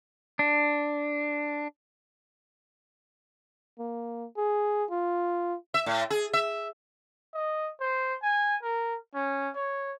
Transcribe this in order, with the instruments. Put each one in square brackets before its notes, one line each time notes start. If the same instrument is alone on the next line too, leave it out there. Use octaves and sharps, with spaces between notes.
[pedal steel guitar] D4
[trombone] A#3
G#4
F4
[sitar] E5
A2
G#4
E5
[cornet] D#5
C5
G#5
A#4
C#4
C#5